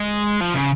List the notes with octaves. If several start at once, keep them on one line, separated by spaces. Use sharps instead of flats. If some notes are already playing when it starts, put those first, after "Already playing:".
Already playing: G#3
F3
C#3